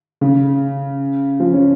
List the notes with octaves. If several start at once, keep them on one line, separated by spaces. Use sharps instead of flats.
C#3
F3
C#4